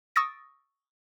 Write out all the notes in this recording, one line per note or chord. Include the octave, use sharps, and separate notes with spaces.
C#6 D#6 E6 A6 A#6 D7